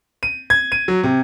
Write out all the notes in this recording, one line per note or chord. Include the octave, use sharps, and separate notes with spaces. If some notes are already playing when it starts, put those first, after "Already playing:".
D#7
G#6
D#7
F#3
C3